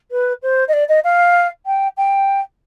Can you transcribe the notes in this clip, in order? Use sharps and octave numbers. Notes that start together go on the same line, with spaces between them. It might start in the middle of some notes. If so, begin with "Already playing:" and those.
B4
C5
D#5
D5
D#5
F5
G5
G5